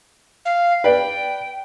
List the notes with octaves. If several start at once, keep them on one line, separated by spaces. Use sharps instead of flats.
F5
B4 D5 G5